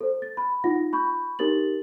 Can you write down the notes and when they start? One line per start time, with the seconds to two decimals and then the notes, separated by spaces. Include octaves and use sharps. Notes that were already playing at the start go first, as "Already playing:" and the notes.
0.01 A4 C5
0.22 A6
0.37 B5
0.64 D#4 F4 F#5 A#6
0.93 B5 C#6 G6
1.39 D#4 G4 A#4 A6 F#7